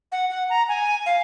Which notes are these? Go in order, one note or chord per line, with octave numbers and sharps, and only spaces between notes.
F#5
F#5
A#5
G#5
F5